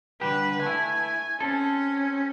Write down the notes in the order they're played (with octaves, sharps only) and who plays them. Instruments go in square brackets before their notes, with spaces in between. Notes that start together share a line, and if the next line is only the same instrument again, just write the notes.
[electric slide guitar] D3 G3 G4 [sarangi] B4
[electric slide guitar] A3 E4 [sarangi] G#5
[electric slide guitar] C4 A4 [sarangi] C#4